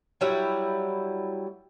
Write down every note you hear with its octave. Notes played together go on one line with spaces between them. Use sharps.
F#3 G3 E4